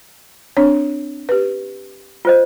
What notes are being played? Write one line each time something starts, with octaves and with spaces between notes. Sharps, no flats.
C4 D4 C#5
G4 B4
F4 C5 D#5